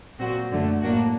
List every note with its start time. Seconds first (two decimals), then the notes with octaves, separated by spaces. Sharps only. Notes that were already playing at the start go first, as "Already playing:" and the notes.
0.19 A#2 F#3 C4 F#4
0.50 F#2 D3 F#3 A3
0.82 A2 F#3 A#3 D4 F#4